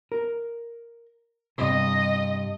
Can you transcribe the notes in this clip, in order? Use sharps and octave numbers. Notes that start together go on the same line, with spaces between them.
A#4
G2 C3 D#5